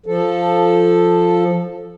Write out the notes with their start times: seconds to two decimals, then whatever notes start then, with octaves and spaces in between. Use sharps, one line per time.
0.06 F3 A4